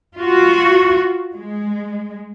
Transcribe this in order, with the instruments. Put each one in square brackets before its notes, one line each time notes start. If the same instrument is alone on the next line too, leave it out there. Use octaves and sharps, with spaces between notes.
[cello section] F4 F#4
G#3